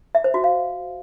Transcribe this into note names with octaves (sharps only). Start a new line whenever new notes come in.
E5
C5
F#4
F5